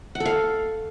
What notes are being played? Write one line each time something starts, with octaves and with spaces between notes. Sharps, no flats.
F#5
A4
F5